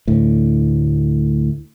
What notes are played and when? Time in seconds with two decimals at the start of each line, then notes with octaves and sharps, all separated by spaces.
0.08 D2 A2